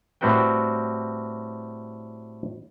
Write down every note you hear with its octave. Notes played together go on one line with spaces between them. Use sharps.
A2 G3 C4 F#4 B4 G5